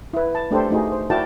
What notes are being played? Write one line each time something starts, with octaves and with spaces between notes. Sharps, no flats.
E4 B4
A5
A3 D4 G4 A4 C5
A3 D#4 F#4 G#4
C5
E4 F#4 A#4 D5 G5 A5